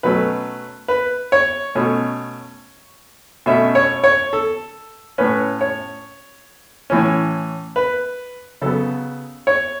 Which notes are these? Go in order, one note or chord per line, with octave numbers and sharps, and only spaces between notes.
B2 F#3 A3 C#4 B4
B4
C#5
B2 A3 C#4
B2 A3 C#4 E5
C#5
C#5
A4
A2 A3 C#4 B4
C#5
A2 E3 C#4
B4
C#3 F#3 B3 A4
C#5